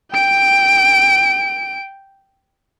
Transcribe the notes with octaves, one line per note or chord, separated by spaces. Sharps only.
G5 D7